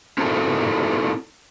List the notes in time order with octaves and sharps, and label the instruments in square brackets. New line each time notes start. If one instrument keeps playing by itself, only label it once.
[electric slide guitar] C4 D#4 E4 F#4 A4 A#4